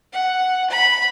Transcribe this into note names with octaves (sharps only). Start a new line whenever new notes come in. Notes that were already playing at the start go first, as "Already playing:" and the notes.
F#5
B5